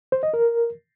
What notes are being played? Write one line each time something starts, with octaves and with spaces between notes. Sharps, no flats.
C5
D#5
A#4